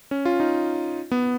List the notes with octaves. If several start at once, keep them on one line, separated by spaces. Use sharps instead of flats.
C#4
F4
D#4
B3